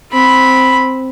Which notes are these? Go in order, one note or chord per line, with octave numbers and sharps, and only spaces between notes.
C4 B5